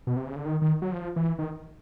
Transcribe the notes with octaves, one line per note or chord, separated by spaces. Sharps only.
B2
C3
C#3
D3
D#3
D#3
F#3
F3
E3
D#3